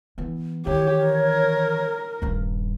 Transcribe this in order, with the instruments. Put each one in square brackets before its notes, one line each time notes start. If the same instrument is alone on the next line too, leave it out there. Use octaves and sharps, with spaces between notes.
[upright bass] E3 B3
[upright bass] D#3 E3 [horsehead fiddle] G4 [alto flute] C#5
[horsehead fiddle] A#4
[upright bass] D#1 G2